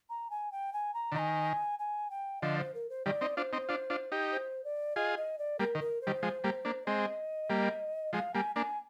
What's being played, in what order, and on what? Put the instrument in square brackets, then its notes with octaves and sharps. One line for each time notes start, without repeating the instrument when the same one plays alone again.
[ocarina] A#5
G#5
G5
G#5
A#5
[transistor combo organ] D3
[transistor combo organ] D#3 [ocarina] A#5
[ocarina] G#5
G#5
G5
[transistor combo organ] D3 F3 [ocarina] D#5
[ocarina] C5
A#4
C5
[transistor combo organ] D#3 G3 [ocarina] D5
[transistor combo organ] C4 D#4
[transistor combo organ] D4 F4 [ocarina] C5
[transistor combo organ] C4 D#4
D4 F4
D4 F4
D#4 G4
[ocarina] C5
D5
[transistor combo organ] F4 G#4 [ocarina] D#5
[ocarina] D#5
D5
[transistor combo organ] G3 A#3 [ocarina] A#4
[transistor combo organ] D#3
[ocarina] A#4
C5
[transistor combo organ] D#3 G3
F3 G#3
G3 A#3
A#3 D4
[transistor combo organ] G#3 C4 [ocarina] D#5
[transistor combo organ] G3 A#3
[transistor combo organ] F3 G#3 [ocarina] F5
[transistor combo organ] G3 A#3 [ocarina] G#5
[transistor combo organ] A#3 D4 [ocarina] G#5